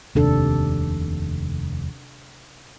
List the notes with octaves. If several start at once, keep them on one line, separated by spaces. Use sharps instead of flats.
F1 D#2 C3 D4 A4